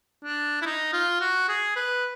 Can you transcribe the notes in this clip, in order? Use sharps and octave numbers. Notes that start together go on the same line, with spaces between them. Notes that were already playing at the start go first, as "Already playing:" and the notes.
D4
E4
D#4
F4
F#4
G#4
B4